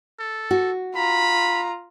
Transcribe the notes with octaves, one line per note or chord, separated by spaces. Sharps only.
A4
F#4
F4 A#5 B5